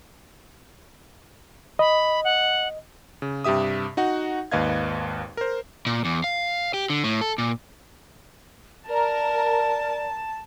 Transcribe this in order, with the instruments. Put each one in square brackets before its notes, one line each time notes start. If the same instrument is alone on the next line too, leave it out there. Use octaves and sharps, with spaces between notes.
[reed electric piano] D#5 [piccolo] B5
[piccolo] F#5
[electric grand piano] C#3
G2 C3 G4 E5 D#6
D#4 F#4 F#5
G#1 D#2 B4 D#5 F5 G#6
A#4 C5
[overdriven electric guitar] A#2
E2
F5
G4
D3
A2
A4
A#2
[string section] A#4 [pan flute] D5 [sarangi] A5